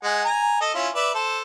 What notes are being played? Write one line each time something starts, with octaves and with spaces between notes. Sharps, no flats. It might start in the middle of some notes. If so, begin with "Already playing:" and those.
G#3 F#5 G#5
G#5 A#5
A4 D#5
C#4 E4 F4
B4 D5 E5
A4 C5